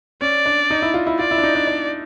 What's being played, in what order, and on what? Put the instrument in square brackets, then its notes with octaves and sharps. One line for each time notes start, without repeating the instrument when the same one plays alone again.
[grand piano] C#4 [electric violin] D5
[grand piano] D4
D#4
E4
F4
E4
[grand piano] F4 [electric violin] D5
[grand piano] E4
D4
D#4
D4
D4